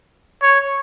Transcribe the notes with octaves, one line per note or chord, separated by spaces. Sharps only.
C#5